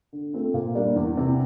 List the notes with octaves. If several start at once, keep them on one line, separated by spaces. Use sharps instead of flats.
D3
A3 C4 F4
A#2
G3 A#3 D4
E2
C3 E3